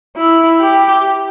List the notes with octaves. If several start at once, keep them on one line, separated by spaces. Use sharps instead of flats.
E4
G4